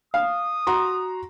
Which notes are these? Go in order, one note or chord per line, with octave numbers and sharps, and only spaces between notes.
F5 D#6
F#4 A#5 C6